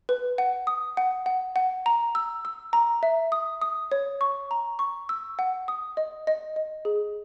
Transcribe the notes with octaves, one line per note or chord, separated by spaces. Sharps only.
B4
F#5
D#6
F#5
F#5
F#5
A#5
E6
E6
A#5
E5
D#6
D#6
C#5
C#6
A#5
C#6
E6
F#5
D#6
D#5
D#5
D#5
G#4